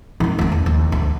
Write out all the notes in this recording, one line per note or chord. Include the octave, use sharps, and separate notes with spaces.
D#3 D#4
A3 C#4
E2
D#2
D2